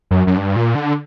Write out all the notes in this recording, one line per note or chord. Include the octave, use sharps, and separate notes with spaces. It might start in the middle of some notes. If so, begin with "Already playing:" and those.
F#2
F#2
G2
A#2
D3